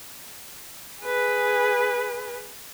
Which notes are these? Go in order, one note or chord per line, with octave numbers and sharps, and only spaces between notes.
G#4 B4